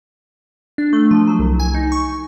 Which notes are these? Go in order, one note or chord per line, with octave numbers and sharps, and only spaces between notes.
D4
A3
F3
F#3
C2
G#5
D#4
C#6